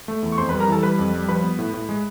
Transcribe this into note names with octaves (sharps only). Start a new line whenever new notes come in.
A3
E2
C#6
F2 C5 C6
G3 B4 B5
A#4 A#5
E3 A4 A5
G3 B4 B5
F2
G3
F3 B4 B5
B3
A2
A2
G#3